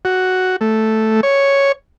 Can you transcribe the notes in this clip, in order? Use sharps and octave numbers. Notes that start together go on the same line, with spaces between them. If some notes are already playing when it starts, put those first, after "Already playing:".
F#4
A3
C#5